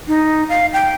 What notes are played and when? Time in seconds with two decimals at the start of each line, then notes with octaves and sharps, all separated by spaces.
0.08 D#4
0.49 F5
0.73 G5